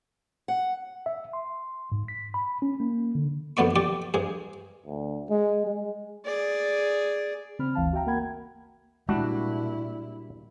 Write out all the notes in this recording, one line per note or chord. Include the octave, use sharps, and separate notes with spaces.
F#5
E5
C6
G#2
B6
B5
C#4
A#3
D3
F#2 D3 B3 D5 C#6
G4 D5 C#6
G2 G#4
D2
G#3
G#3
G#4 D5
C#3 C4 B5 F6
G1 D2 E3 F5 A5
F#4 E5 G5 A#5
A#3 A#4 F#5 G5 B5 G#6
A#2 G3 G#3 D4 E4 F#4